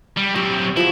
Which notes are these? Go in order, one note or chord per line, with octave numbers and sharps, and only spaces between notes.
G3
F#3 C4 G4
F3 E4 F#4 G#4